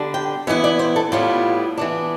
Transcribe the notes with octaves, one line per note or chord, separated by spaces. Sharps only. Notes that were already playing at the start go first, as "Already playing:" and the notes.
Already playing: D3 G3 D4
G5
E3 B3 E4 E5
D5
C5
A4
A2 G3 B3 E4 F4
E3 B3 D4